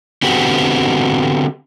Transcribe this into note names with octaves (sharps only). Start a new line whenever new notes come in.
D3 B3 C4 F#4 G4